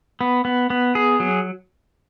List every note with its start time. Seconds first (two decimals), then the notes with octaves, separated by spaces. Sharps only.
0.21 B3
0.45 B3
0.70 B3
0.95 G#4
1.20 F#3